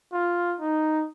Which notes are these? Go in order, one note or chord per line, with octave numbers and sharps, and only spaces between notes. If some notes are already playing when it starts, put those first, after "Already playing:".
F4
D#4